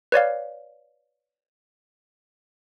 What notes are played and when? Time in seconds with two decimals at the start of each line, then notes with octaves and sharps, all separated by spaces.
0.12 B4 C#5 D5 F5